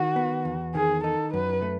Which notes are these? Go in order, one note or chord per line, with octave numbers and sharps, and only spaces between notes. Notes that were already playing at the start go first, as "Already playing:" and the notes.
Already playing: D#3 F#4
B3
E2
D#3 G#4
D#4 A4
F#2 B4
A3